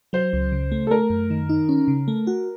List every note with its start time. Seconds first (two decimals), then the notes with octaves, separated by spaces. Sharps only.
0.13 F#3 C5
0.33 C#2
0.52 C#3
0.72 A3
0.87 A4
0.91 A3 A#4
1.10 F#2
1.30 D#3
1.49 D#4
1.69 C#4
1.88 C#3
2.08 A3
2.27 F#4